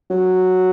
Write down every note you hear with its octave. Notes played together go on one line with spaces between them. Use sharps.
F#3